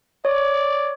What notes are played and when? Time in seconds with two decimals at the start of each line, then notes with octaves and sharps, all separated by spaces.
0.25 C#5 D5